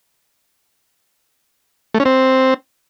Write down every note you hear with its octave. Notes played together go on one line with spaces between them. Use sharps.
A3
C#4
C4